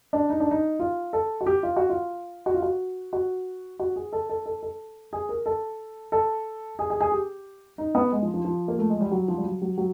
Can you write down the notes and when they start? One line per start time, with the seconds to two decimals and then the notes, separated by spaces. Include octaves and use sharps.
0.13 D4
0.30 D#4
0.40 D4
0.51 D#4
0.80 F4
1.13 A4
1.41 F#4
1.46 G4
1.63 F4
1.76 F#4
1.90 F4
2.46 F#4
2.54 F4
2.62 F#4
3.13 F#4
3.79 F#4
3.96 G#4
4.13 A4
4.29 A4
4.46 A4
4.63 A4
5.13 G#4
5.29 A#4
5.46 A4
6.12 A4
6.79 G#4
6.90 G#4
7.01 G#4
7.12 G4
7.78 D#4
7.95 B3
8.12 G#3
8.22 F3
8.34 F3
8.45 F3
8.68 A#3
8.79 A3
8.90 G#3
9.01 G3
9.12 F#3
9.28 F3
9.38 G3
9.45 F#3
9.62 F#3
9.78 F#3